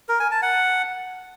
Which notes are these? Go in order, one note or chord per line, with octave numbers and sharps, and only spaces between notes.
A#4
G#5
A5
F#5